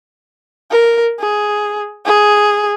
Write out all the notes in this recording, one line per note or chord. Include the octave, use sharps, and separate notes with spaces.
A#4
G#4
G#4